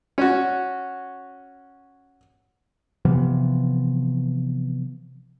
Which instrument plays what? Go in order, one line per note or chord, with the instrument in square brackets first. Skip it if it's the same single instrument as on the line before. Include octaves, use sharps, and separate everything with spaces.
[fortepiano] C#4 F#4
[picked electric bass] C3 E3 F3 B3